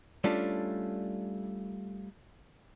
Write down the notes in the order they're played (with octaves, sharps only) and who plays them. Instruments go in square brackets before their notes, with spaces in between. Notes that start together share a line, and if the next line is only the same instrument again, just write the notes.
[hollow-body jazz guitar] G3 A3 C#4 D4 F4